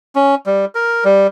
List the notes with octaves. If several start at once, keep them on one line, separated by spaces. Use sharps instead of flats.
C#4
G3
A#4
G3